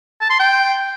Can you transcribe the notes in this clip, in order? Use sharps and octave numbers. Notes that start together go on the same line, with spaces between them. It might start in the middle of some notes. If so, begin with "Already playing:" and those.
A5
C6
G5